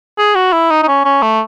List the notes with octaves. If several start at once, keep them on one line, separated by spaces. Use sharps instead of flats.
G#4
F#4
E4
D#4
D#4
C#4
C#4
A3